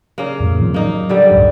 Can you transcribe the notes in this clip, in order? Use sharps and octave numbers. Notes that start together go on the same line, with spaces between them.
C#3 A#3
F2 A2 A3
D#3 F3 C4
F#3 A#3 D#4
D3 G3
F#1 C2 G#2